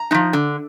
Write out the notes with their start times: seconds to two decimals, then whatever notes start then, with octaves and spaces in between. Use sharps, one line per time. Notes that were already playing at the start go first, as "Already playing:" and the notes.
Already playing: A#5
0.11 G#3 D#4
0.14 F3
0.33 D3